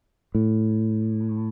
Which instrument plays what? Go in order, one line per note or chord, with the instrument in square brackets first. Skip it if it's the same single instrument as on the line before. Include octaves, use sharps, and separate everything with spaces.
[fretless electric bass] A2